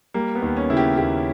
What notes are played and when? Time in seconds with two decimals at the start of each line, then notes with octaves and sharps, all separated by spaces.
0.14 G3 A#3
0.35 B3
0.42 D#2
0.57 C#4
0.70 C#3 E4
0.77 G4
0.97 D#2 G4